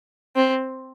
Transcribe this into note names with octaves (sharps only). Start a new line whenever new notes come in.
C4